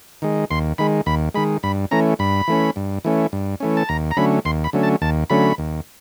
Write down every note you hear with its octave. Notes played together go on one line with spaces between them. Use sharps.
D#3 G#3
D#2 C6
D#3 G#3 B5
D#2 B5
D#3 G#3 B5
G2 B5
E3 A3 C#4 A#5
G2 B5
E3 A3 C#4
G2
E3 A3 C#4
G2
E3 A3 C#4
A5
D#2 A#5
A#5
D3 F#3 A3 C#4 B5
D#2 C6
B5
D3 F#3 A3 C#4
A5
D#2 A5
D3 F#3 A3 C#4 B5
D#2